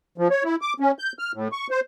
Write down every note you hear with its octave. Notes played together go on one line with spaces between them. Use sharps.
F3
C#5
E4
D6
C#4
G6
F6
A2
C#6
C5